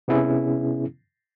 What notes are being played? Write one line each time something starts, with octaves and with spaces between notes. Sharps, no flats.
C3 B3 C#4 E4 G#4